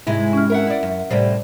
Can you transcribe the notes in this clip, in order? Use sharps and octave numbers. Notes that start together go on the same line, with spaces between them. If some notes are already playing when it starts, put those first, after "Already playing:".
G#2 C3 G#3 E4
C#4 F6
A#4 E5 F#5
E4 D5
F#2
A2 C3 G3 C5 D5